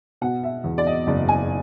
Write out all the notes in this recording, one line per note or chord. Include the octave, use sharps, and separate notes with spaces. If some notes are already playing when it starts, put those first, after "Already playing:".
B2 F#5
E5
E2
D5
D#5
F#1 D5
G#5